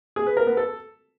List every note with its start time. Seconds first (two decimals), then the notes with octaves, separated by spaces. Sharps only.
0.16 G#4
0.27 B4
0.37 A#4
0.47 B3
0.57 A4